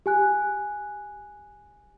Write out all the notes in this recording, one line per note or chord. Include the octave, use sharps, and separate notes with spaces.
G4 G#5 F#6